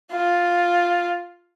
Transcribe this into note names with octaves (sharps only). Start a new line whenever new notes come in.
F4